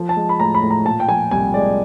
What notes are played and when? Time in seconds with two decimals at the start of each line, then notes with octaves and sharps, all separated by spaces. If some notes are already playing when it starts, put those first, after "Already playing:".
Already playing: F3
0.09 A5
0.16 G#3
0.29 B5
0.40 A2 A#5
0.55 B5
0.62 A2
0.71 A#5
0.85 A#2 A5
1.00 G5
1.08 F3 G#5
1.31 C2 G#5
1.54 G#3 D5